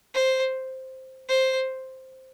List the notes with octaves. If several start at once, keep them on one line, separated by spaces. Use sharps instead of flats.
C5
C5